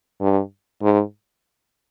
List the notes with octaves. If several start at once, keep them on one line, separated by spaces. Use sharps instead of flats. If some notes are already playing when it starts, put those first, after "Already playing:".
G2
G#2